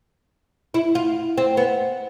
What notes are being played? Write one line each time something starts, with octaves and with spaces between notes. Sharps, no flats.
E4
F4
C4
B3